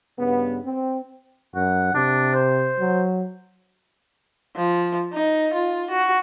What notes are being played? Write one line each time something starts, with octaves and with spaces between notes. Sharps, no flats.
G2 C#3 B3
C4
F#2 F#5
C3 D4
C5
F#3
F3
D#4
F4
F#4